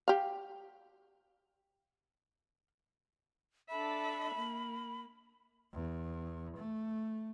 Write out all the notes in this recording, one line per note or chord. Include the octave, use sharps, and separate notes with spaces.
G4 F5
D4 A4 E5 B5
A#3
E2
A3